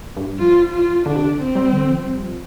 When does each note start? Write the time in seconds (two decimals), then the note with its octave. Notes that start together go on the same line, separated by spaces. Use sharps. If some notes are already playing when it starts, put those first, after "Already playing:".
0.17 G2
0.39 F3 F4
0.73 F4
1.06 D3 D4
1.15 C3
1.22 D3
1.38 C4
1.55 G3
1.72 D3
1.90 F3
2.05 G3
2.23 F3